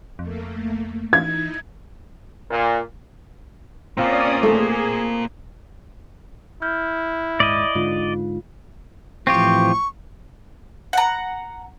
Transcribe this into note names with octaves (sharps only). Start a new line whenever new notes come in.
F2 A3 A#3
E3 D#4 E4 G#6
A#2
A#2 A#3 C4 C#4 F4 D5 D#6
A3 G#4
E4 F6 G6
D#1 G#2 D5 D#5
G#2 D3 F4
A2 E3 F3 C4 F4 G4 C#6
F#5 A#5